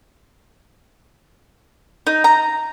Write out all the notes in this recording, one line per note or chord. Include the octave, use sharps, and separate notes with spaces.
D#4
A#5